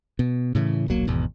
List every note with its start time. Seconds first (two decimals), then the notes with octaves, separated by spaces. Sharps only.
0.19 B2
0.55 A2 C#3 E3
0.88 D#1 B1 F#3 A#3
1.07 G#1 E2 B2